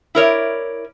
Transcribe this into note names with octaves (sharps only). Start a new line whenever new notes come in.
E4 A#4 C#5 D5